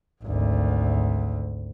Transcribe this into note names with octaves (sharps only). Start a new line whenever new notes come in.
G#1 D2